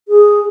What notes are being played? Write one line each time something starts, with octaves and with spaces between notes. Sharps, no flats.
G#4